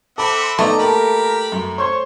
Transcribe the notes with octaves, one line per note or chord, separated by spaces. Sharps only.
C4 A4 E5 F#5 B5 D6
C6
A3 B3 D#4 D5 D#5 A#5
A#3 G4 A4 A#4 B5
F#2
C5 C#5 C6